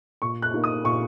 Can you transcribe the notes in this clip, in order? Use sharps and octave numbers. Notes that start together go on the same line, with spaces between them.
A#2 C#6
F#6
A#3 D#4
D#6
A#2 C#6